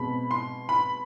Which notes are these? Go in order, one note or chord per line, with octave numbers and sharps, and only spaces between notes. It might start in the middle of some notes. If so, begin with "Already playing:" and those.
Already playing: B2 G#3 C4 B5
C6
B5